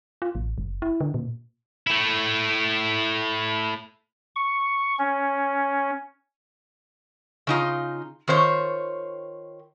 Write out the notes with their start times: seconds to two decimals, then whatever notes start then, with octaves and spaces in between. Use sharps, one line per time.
0.22 F4
0.35 A1
0.58 F#1
0.82 E4
1.01 D3
1.14 A#2
1.87 A3 E4
4.36 C#6
4.99 C#4
7.47 C#3 D#4 F4
8.28 D#3 F4 C5 C#5